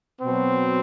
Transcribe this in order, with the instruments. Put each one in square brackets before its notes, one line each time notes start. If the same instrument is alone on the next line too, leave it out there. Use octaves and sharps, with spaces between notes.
[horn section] B2 F#3 C4